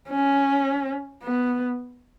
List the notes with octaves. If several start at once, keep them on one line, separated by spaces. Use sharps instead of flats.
C#4
B3